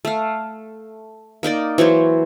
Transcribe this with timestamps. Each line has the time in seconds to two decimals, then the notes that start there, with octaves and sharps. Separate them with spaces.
0.05 A3 F5
1.43 A#3 D#4 A#4 D5
1.78 E3 F#3 C5 C#5